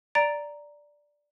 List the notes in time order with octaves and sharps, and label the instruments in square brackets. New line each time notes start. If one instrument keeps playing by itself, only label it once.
[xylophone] D5 A#5 A6 D7